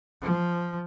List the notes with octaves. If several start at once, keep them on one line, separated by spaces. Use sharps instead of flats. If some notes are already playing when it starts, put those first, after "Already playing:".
F3